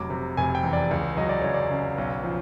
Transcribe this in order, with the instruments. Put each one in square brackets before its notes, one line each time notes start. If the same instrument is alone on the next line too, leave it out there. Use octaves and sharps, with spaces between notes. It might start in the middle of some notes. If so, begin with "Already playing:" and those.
Already playing: [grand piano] F1 F#3 [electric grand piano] D6
[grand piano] C3
[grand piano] F1 [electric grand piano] G#5
[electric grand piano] G5
[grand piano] E2
[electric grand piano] D5
[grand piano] C#2
[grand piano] F#3 [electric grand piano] D#5
[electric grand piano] D5
[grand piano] C#2 [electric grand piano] C#5
[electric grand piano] D5
[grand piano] C#3
B1
F3